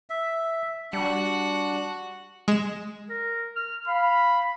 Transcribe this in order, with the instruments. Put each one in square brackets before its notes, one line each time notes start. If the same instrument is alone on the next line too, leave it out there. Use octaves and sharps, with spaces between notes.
[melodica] E5
[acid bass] G3 [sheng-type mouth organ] D4 [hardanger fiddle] F#4 F#5
[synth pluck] G#3 E7
[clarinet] A#4
F6
[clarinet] F5 [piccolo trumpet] B5